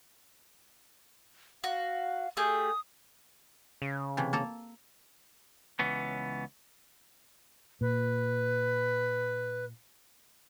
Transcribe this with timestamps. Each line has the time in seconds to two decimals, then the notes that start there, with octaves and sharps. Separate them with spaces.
1.64 F#4 F5
2.37 A3 G4 G#4 D#6
3.82 C#3
4.17 C3 E3 A3
4.33 A#3 A4 A#5
5.79 C#2 E3 B3 C#4
7.81 A#2 B4